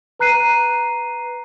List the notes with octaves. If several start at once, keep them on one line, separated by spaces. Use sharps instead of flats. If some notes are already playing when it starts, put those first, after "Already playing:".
B4 A#5 F#6 C7 D#7